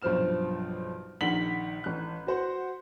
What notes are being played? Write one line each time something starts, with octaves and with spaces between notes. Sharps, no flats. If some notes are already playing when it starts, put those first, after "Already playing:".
B1 G2 F3 C4 F6 E7
A#1 D#3 F#5 B6 F#7 G7
A1 F#6
F#4 C5 F#5